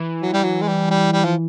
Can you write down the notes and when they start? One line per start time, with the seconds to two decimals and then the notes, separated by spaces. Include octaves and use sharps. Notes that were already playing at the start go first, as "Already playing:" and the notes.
Already playing: E3
0.22 F#3
0.33 G3
0.44 F#3
0.62 G#3
0.68 G3
0.91 G3
1.13 G3
1.25 F3